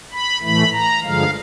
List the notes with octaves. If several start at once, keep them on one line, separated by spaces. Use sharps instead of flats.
B5
A2 E3 A3 B5
A#5
G2 D3 F3 G#3 F5